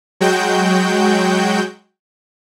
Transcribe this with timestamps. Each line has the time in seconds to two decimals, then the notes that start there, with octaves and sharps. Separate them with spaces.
0.21 F#3 G#3 F#4 G5 G6